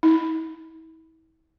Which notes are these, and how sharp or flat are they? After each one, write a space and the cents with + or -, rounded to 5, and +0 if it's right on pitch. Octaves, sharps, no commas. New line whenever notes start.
E4 -40